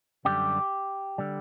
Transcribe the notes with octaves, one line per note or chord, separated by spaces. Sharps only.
F#2 D3 G3 G4
D3 G3